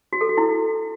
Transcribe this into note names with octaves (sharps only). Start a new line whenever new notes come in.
F#4
A4
F#4
E4